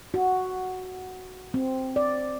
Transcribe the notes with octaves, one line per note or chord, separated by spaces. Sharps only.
F#4
C4
D5